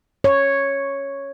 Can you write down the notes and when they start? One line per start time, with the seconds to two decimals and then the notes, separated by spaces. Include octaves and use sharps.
0.24 C#5